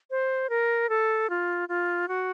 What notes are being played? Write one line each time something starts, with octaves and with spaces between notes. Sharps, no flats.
C5
A#4
A4
F4
F4
F#4